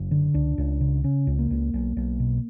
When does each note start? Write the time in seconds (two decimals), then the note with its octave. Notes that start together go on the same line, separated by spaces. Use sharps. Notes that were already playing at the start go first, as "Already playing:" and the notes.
Already playing: F#1
0.11 D3
0.34 C#2 D4
0.58 C#2
0.81 C#3
1.04 C#3 C#4
1.27 C#2
1.39 A#3
1.50 C#2
1.74 B1
1.96 B1
2.20 B2